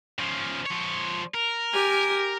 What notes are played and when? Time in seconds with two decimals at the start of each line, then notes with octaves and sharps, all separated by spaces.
0.19 C#3 F3
0.66 F3 C#5
1.34 A#4
1.73 G4 G#5